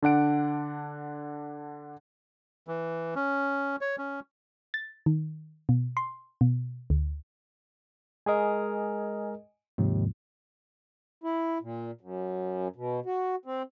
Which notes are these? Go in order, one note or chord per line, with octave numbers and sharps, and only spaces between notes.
D3 D4 F#5 D7
E3
C#4
C#5
C#4
A6
D#3
B2
C6
B2
D2
G#3 G#4 A#4 D#5 G#5
D#2 G#2 C3 F3
E4
A#2
F#2
B2
F#4
C4